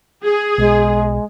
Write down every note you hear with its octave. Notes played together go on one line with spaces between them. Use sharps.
G#4
B1 G#3